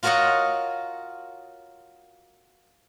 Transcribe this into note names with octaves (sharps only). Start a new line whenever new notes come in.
F4 F#4 A#4 C#5 D#5 F#5